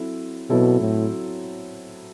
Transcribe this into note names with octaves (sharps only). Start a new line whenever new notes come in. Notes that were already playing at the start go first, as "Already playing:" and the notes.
Already playing: F#3 C4 E4 A4
B2 F#3 C4 E4 A4
A2